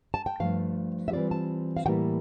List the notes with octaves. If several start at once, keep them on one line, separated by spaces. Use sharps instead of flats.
A5
G5
G2 F3 A3 F5
E5
E3 G3 C4 F4 D5
A5
F5
A2 E3 G3 A#3 E4 G5